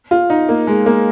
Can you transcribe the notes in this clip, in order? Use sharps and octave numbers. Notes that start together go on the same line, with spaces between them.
F4
D#4
A#3
G#3
A#3